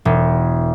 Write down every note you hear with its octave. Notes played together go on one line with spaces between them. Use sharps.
E1